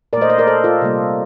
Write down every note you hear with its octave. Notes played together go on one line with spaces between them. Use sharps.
A#2 A3 A#4 C5 D5 D#5
C5 D#5
A#4 D5
A4 C5
F4 A4
C3 G3 A#3